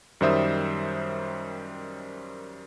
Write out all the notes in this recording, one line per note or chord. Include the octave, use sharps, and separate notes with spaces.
F#2 D#3 G3 C5 E5 D#6